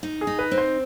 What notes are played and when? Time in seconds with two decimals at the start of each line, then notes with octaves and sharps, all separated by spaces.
0.03 D#4
0.21 G#4
0.27 D#4
0.39 B4
0.51 C4
0.58 C5